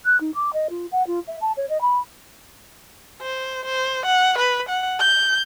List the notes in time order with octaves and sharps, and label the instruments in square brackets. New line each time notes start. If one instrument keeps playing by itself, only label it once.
[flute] F#6
D#4
D6
D#5
F4
F#5
F4
E5
A5
C#5
D#5
B5
[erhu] C5
C5
F#5
B4
F#5
G6